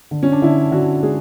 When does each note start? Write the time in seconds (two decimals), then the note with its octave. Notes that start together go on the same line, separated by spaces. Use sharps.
0.11 D3
0.23 C#4
0.32 D4
0.42 D3 E4
0.71 D3 F#4
1.03 G#3 G#4